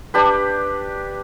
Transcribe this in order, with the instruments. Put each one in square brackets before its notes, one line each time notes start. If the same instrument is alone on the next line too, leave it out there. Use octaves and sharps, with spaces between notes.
[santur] D4 G4 B4